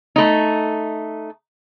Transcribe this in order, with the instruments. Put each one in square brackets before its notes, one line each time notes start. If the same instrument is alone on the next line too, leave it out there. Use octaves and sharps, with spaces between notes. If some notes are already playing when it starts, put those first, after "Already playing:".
[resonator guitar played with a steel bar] A3 D#4